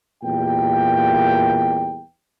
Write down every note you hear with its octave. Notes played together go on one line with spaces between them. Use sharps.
E2 A#2 G3 G4 A#4 G5